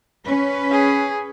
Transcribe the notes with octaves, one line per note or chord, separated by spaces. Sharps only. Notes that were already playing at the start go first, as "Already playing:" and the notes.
C#4 B4
G#4